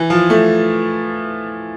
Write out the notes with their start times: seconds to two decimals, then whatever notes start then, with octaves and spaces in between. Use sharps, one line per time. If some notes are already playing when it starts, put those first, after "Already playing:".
Already playing: E3
0.10 F3
0.30 A3